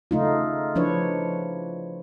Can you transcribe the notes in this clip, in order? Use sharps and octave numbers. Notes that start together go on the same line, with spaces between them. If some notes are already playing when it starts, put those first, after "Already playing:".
C#3 A3 D#4 F4
F3 D4 E4 B4 C#5